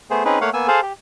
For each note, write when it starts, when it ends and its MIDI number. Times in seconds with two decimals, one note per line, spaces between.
0.10 0.23 57
0.10 0.23 59
0.10 0.23 68
0.10 0.23 72
0.25 0.39 60
0.25 0.39 61
0.25 0.39 63
0.25 0.39 68
0.25 0.39 71
0.41 0.50 57
0.41 0.50 58
0.41 0.50 73
0.41 0.50 77
0.41 0.50 78
0.53 0.67 58
0.53 0.67 59
0.53 0.67 80
0.53 0.67 88
0.68 0.81 68
0.68 0.81 69
0.68 0.81 72
0.68 0.81 77
0.82 0.93 67